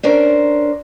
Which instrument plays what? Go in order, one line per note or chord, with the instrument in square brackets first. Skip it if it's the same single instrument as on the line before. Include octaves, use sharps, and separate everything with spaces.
[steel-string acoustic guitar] C#4 D4 A#4 C5